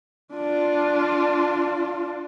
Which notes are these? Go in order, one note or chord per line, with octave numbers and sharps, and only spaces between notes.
D4 F4